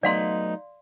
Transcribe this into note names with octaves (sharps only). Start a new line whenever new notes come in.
F#3 A3 B3 D#4 D5 F5 C6